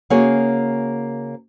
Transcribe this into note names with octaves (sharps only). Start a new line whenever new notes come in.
C#3 A#3 F#4 G#4 A#4 C#5